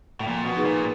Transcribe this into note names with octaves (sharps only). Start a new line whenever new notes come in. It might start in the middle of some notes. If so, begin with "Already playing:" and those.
A2
A#2 F3
B2
A#3 D#4 G#4 B4
A#2